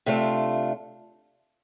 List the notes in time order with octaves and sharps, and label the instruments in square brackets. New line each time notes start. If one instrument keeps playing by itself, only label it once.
[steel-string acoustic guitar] C3 A3 D4 F4